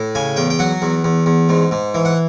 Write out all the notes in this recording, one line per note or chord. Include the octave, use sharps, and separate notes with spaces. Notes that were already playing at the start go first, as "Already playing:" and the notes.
Already playing: A2
C#3 G#5
E2 G5
G5
F#3 F#5
E2
E2
E2
G#2
G#2
E3
F#5